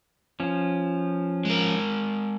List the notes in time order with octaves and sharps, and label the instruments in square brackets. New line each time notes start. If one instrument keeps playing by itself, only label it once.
[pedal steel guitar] F3 C#4
[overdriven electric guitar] G#3 A#4